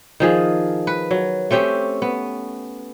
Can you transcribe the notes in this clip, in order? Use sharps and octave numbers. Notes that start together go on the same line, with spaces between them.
D#3 F3 G#4
B4
F#3
A3 C4 C#4 G4
B3